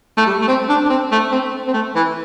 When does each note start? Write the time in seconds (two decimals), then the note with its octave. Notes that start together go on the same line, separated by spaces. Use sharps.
0.17 A3
0.26 G3
0.42 A3
0.48 C4
0.69 D4
0.85 D4
0.90 C4
1.12 A3
1.32 C4
1.67 C4
1.74 A3
1.96 E3